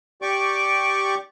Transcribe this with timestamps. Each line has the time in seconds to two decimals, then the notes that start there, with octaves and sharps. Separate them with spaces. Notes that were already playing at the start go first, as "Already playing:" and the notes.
0.22 G4 D5 C#6 D6